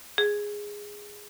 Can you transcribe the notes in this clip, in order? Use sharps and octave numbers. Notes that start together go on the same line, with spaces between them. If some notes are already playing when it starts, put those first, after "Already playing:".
G#4